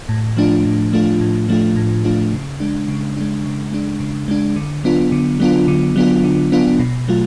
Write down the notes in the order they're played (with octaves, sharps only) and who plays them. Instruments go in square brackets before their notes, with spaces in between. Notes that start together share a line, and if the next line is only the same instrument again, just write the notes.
[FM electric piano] A2
F3 A3 D4 F4
A2
F3 A3 D4 F4
A2
F3 A3 D4 F4
A2
F3 A3 D4 F4
C#3
G#3 D4
C#3
G#3 D4
C#3
G#3 D4
C#3
G#3 D4
D3
F#3 B3 D4 F4
D3
F#3 B3 D4 F4
D3
F#3 B3 D4 F4
D3
F#3 B3 D4 F4
B2
F#3 A3 F4